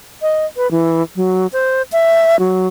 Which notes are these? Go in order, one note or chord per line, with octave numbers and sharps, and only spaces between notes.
D#5
B4
E3
F#3
C5
E5
F#3